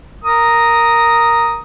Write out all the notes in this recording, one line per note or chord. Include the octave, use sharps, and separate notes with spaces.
A#4 D#6